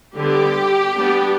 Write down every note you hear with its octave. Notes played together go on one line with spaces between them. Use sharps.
D3 G3 B3 G4
G3 B3 D4